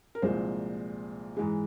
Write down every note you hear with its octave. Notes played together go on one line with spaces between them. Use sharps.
A#4
C2 A#2 F3 G#3 C5
G#2 E3 G#3